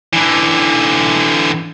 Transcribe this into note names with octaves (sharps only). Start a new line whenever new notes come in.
D3 E3